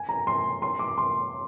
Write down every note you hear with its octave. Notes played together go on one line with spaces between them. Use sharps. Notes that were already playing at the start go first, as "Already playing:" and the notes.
Already playing: G#5
A#5
C6
C6
D6
C6